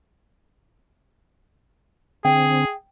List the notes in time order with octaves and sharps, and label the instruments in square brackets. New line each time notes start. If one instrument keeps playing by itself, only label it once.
[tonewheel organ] D3 C4 [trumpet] G#4 [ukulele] G5